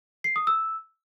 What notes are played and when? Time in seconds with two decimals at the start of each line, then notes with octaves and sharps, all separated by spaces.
0.24 C7
0.36 D#6
0.47 E6